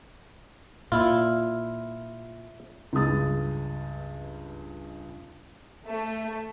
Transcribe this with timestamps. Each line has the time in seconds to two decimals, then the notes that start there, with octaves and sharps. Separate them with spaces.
0.92 A#2 E4 F4
2.93 C#2 G2 G#3 D#6 A6
5.85 A3